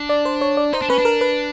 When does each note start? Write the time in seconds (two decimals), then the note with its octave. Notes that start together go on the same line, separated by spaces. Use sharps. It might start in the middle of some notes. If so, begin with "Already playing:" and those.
Already playing: D4
0.09 D5
0.25 C5
0.41 C#5
0.57 D5
0.73 D#4 C5
0.81 D4
0.90 C#4 B4
0.98 D4
1.05 A#4
1.21 B4